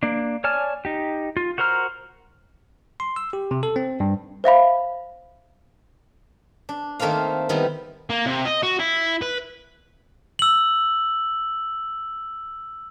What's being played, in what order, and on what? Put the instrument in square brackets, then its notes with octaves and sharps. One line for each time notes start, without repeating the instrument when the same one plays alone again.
[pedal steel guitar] A#3 D4
C#5 D5 G#5 A5 F6
D#4 G4
F4
F#4 A#4 C5 A#5 F6
[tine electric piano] C6
E6
G4
C3
A4
C4
G2
[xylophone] C5 E5 F5 B5
[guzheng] D4
D#3 A3 A#3 C4 F5
D#3 G3 B3 E4
[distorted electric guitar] A#3
C3
D#5
F#4
E4
B4
[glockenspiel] E6 F#7